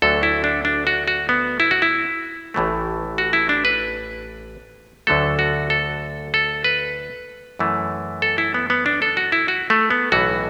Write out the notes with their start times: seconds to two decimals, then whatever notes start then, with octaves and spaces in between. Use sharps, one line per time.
0.02 D2 D3 F#3 A3 A4
0.23 E4
0.44 D4
0.65 D4
0.87 F#4
1.08 F#4
1.29 B3
1.60 E4
1.71 F#4
1.82 E4
2.54 A1 A2 E3 A3
3.18 F#4
3.33 E4
3.49 D4
3.65 B4
5.07 D2 D3 F#3 A3 A4
5.39 F#4
5.70 A4
6.34 A4
6.64 B4
7.59 F#2 E3 A3
8.22 A4
8.38 E4
8.54 B3
8.70 B3
8.86 D4
9.02 A4
9.17 F#4
9.32 E4
9.48 F#4
9.70 A3
9.91 B3
10.12 B1 A2 E3 F#4